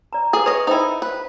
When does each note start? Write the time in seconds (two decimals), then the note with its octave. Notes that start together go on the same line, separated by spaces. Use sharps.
0.13 D5 A#5
0.33 G#4 A4 B4
0.46 B4 C#5 D#5
0.67 D#4 E4 C5 E5 G5
1.02 B4